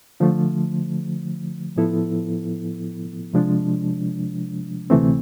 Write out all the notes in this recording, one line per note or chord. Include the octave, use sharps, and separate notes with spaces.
D3 F3 A3
A2 F3 B3 E4 A4
C3 F3 G#3 D4
D2 C3 E3 A3 C4